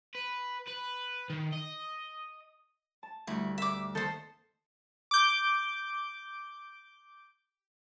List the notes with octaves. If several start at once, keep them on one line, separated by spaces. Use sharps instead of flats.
B4
B4
D#3
D#5
A5
D2 G2 E4
E5 D6
D#3 A#3 A4 C5 G6
D6 G6